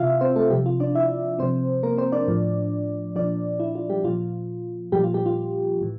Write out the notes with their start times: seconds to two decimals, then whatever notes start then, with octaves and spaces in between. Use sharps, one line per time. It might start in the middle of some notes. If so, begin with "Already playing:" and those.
Already playing: C3 E3 F4 E5 F5
0.21 C4 C5
0.36 A3 A4
0.50 C3 F3 G3 G4
0.66 F4
0.80 D4 D5
0.95 E4 E5
1.39 C3 F3 C4 C5
1.83 A#3 A#4
1.98 C4 C5
2.12 D4 D5
2.28 A2 F3
3.16 A#2 F3 D4 D5
3.60 E4
3.75 F4
3.90 G3 G4
4.04 A#2 F3 F4
4.92 A#2 F3 G3 G4
5.04 F4
5.14 G3 G4
5.26 F4
5.81 A2 E3